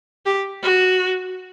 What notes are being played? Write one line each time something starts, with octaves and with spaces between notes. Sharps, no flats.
G4
F#4